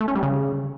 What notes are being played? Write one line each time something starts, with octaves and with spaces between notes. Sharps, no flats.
A3
C#4
G3
C#3